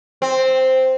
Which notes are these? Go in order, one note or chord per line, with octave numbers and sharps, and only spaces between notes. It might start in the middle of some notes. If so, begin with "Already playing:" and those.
C4